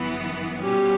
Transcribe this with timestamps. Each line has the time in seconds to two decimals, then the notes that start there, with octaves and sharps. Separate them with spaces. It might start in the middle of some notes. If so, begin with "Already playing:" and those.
Already playing: G1 F#2 E3 B3
0.62 B2 G3 C#4 F#4 G4